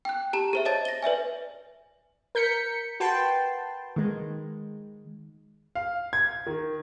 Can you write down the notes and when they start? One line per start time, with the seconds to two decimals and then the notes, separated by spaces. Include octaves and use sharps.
0.05 G5 F#6
0.33 G4 A5 A#5 E7
0.53 G#4 C5 E5
0.65 C#5 D#5 A5 A6
0.85 A#6 G7
1.03 B4 D5 E5 G#5
2.35 A#4 G6 B6 C#7
3.00 F#4 B4 G5 A5 C6
3.96 D#3 G#3
5.75 F5
6.13 G#6
6.47 D#3